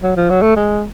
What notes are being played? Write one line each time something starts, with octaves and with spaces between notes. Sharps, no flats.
F#3
F3
F#3
A3
G#3